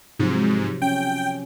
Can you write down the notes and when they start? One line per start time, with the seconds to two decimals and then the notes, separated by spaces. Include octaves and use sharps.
0.20 G#2 C3 F3 F#3
0.82 C#4 G5